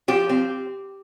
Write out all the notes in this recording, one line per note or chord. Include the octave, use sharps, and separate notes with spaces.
F3 G4
C4